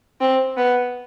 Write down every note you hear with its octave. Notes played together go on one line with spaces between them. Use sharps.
C4
B3